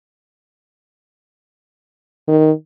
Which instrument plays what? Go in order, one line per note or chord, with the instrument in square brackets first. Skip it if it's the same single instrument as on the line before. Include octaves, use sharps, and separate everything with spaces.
[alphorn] D#3